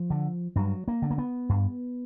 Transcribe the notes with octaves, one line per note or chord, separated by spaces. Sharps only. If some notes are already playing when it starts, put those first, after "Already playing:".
Already playing: F3
D3
G2 F#3
A#3
D3
A#3
B3
G2